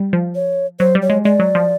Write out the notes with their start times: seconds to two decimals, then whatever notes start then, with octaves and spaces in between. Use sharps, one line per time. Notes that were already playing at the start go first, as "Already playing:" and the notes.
Already playing: G3
0.13 F3
0.35 C#5
0.79 F#3 C5
0.95 G3
1.02 C#5
1.10 G#3
1.24 G#3 D5
1.39 F#3
1.55 F3